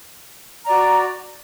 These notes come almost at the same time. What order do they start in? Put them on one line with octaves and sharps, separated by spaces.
A#5 D5 F#4